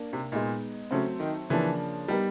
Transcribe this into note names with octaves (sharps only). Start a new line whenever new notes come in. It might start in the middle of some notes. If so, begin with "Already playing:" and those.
Already playing: A#3 D4
C3
A#2 G#3 B3 D#4
C#3 F#3 A3 C4
D#3
C#3 E3 F3 A#3 D4
G3 B3 D#4 G4 A#4